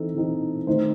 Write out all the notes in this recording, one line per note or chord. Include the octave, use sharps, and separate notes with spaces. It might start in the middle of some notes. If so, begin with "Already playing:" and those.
Already playing: E3 C4 D#4 A4
E3 C4 D#4
D#3 A3 D#4 C5